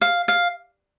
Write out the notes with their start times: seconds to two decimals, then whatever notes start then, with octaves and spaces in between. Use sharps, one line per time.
0.01 F5
0.28 F5